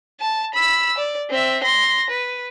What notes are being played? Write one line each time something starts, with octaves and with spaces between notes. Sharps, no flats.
A5
B5 E6
D5
C4 E5
C6 A#6
B4